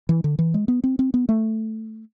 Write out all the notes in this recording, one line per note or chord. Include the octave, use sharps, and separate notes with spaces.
E3
D3
E3
G#3
B3
C4
C4
B3
A3